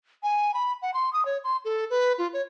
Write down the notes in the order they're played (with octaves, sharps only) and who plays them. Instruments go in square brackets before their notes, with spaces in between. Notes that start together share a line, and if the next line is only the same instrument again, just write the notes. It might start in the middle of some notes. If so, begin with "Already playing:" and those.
[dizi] G#5
B5
F#5
C6
D#6
C#5
C6
A4
B4
F4
C#5